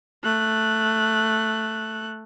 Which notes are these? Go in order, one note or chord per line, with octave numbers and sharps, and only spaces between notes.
A3 F#6